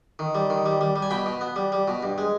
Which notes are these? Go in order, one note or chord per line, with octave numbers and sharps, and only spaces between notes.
D#3
G3
D#3
G3
G3
G3
G#5
B2 G5 B5
B2
B3
G3
G3
B2
G2
G#3